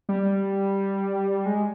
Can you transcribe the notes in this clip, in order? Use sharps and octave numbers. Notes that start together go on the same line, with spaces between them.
G3
G#3